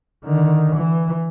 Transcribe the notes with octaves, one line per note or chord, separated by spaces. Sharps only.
D3 D#3
E3